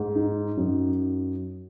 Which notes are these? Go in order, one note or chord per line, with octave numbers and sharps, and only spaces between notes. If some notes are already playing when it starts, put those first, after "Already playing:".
Already playing: G#2
D#4
F#2